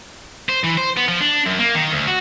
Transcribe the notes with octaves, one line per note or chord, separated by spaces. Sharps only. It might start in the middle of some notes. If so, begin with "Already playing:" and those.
C5
E3
C5
B3
F3
D4
F#2
A#3
D#3
D2
F#4